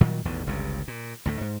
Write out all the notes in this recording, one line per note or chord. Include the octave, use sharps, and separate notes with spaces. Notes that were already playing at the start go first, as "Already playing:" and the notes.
A#2 D#3 F#3 G3
A1 E2 B2 D#3
G1 C#2 G2 C3
A#2
D2 A2 A3
G#2